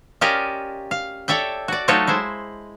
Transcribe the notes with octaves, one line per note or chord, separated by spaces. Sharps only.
C#4 F4 G4 A#4 D5 D#5
F5
A4 C#5 D5 E5 G5
F#4 D5
F#3 A3 D#4 F4 A4 C#5
G#3 E4 C5